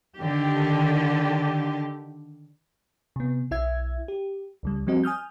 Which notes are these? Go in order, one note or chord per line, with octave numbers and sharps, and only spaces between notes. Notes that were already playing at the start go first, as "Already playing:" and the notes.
D3 D#3 G4
C3 B3
B1 E4 E5 G#6
G4
C#2 C#3 G3
F3 G3 C4 F#4 D#5
G#5 D#6 F6 G6